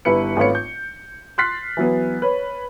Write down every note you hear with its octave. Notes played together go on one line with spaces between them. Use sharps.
G1 G3 E4 B4 C#7
G#1 A3 F4 B4 C#5 C#7
G6
C6 F6 F#6 A6 B6 C7
E3 F#3 B3
B4 C#5